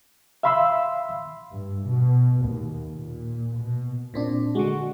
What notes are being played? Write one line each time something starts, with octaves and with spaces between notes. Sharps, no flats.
E5 F5 B5 C6 E6
G2
B2
D#2
A#2
B2
A#2 C4 D4
D3 G#3 F#4